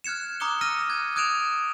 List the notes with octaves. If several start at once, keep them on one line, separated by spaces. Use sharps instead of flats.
F6 F#6 G#6 C#7 E7
A#5 D6 D#6 F#6 C#7 G7
E6 F6 A#6 D#7
F#6 G#6
D#6 F#6 G#6 D7 E7 F7